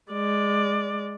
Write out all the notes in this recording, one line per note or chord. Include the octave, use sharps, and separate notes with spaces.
G#3 D5